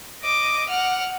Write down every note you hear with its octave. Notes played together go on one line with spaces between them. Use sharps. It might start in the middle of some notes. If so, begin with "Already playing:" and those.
D#5 D6
F#5 F6